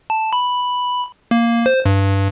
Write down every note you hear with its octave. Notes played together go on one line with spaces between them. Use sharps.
A5
B5
A#3
C5
G2